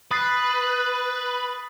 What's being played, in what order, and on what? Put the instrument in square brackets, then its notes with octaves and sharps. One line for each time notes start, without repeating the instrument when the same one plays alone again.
[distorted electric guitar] B4 [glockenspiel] D#6 A6 C7